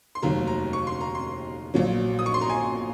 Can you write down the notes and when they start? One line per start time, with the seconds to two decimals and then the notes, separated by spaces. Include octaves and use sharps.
0.15 C6
0.22 F1 D#2 D#3 F#3 A#5
0.47 A#5
0.73 C#6
0.87 C6
1.01 A#5
1.15 C6
1.74 A#1 A#2 F#3
2.19 D#6
2.26 C#6
2.34 C6
2.41 A#5
2.50 G#5